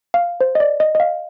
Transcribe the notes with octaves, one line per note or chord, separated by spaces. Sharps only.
F5
C5
D#5
D5
D#5
D#5
F5